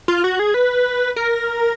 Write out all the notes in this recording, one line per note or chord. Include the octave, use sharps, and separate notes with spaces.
F4
F#4
G#4
B4
A#4